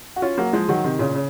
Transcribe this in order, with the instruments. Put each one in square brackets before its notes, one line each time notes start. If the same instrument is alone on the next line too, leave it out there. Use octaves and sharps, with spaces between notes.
[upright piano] F#4
C#4 F4
F#3 A#3
F3 G#3
D#3 F#3
C3 D#3
A#2 C#3
C#3